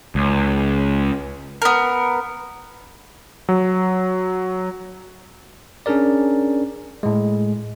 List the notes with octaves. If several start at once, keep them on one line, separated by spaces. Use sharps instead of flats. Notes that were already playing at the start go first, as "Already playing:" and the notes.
C#2
B3 A#4
F#3
C#4 D4 G#4 A#4 D5
A2 G#3